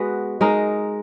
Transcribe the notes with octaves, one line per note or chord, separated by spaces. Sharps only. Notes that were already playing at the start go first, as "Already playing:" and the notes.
Already playing: G#3 B3 F#4 B4
G#3 D#4 A#4